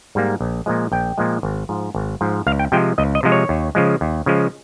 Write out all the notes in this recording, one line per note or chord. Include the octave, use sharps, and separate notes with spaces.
G#2 G3 A#3
A#1
A#2 F3 G#3
A#1 G5
A#2 F3 G#3
G#1
G#2 F3
G#1
G#2 F3
C#2 F5
G5
C3 F3 G#3 G5
C#2 D#5
D#5
C3 F3 G#3
C#5
D#2
C#3 F3 G#3
D#2
C#3 F3 G#3